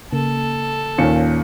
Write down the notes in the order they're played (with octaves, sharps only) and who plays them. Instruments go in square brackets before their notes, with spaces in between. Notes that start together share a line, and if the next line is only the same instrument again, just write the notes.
[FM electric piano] C#3 A#3 [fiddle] A4
[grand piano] D#2 [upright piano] A#2 C#4 C#7